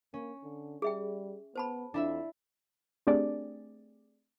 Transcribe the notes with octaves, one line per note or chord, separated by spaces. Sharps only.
A#3 C#4
D3
G3 G#4 E5 G5
B3 C5 A5 B5
F2 D4 E4 E5
A3 C4 D4 G4 G#4 D5